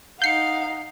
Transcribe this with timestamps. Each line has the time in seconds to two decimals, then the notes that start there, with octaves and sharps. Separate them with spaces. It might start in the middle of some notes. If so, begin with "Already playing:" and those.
0.22 D#4 F5 F#5 G6 C7 C#7